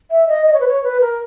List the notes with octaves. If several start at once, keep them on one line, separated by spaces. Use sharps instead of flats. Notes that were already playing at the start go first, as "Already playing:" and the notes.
E5
D#5
D#5
C#5
B4
C#5
B4
A#4